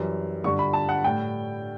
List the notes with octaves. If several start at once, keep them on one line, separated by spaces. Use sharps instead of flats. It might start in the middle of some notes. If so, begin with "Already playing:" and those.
Already playing: F#2 E3 G3
G2 D3 G3 C#6
B5
A5
F#5
A2 G3 G5